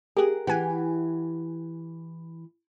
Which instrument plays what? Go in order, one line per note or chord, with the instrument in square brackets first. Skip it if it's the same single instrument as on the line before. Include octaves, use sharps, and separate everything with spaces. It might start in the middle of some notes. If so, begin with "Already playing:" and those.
[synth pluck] G4 G#4 [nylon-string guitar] A#4 F#5
[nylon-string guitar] E3 G4 [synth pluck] F#5 G#5